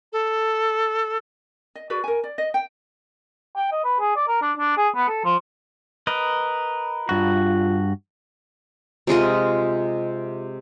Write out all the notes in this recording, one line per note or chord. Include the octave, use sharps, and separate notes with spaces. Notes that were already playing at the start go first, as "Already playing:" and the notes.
A4
D#5
F#4 G#4 B4 D5
A#4 G#5
D5
D#5
G5
G5
D#5
B4
G#4
D5
A#4
D4
D4
G#4
B3
A4
F3
A#4 B4 D#5
G2 F4 F#4
C3 G#3 F4 D#5